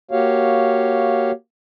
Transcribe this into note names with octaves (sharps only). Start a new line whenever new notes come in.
A#3 F#4 G4 C#5 F5